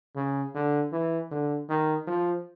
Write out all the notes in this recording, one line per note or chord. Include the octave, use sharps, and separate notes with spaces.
C#3
D3
E3
D3
D#3
F3